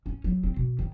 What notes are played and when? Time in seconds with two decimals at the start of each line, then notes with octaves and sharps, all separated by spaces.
0.06 C#4
0.24 F#3
0.43 C4
0.56 B2
0.79 D#3